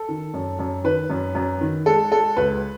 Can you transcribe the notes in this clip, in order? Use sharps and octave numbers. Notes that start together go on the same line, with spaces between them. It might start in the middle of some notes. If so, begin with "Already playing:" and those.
Already playing: A4
D#3
F#2
F#2
D#3 B4
F#2
F#2
D#3
G#3 A4
G#3 A4
C#2 B4